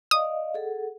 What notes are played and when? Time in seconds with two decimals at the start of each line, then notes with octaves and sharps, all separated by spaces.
0.11 D5 D#5 F5 D#6
0.54 G#4 A4 F#5